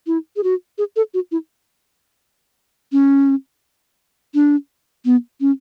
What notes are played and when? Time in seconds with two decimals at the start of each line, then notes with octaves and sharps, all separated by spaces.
0.07 E4
0.36 G#4
0.44 F#4
0.78 G#4
0.96 A4
1.14 F#4
1.32 E4
2.92 C#4
4.34 D4
5.05 B3
5.41 C#4